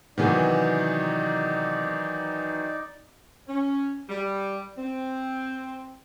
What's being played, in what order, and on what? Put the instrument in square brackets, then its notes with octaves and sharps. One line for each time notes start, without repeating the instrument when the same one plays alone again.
[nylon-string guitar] C3 B3 G#4 [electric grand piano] D#3 E3 F#3 [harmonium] D#4 D5
[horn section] C#4
G3
C4